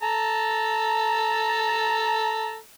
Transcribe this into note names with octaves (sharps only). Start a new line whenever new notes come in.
A4 A5 A#5